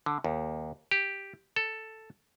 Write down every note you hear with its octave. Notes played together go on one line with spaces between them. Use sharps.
D3
D#2
G4
A4